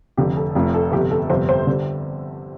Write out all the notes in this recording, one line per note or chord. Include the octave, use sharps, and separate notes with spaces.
F1 F2 D3 G4
A4
F1 F2 F3 A3
A4
G1 F2 C3 G4
A4
G1 F2 C3 G3 C5
C5
D3 G3